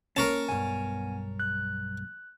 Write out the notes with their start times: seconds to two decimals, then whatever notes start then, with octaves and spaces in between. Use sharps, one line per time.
0.16 A#3 C#4 A#4 C#5 A5
0.49 B1 G2 B3 G#5
1.40 F#6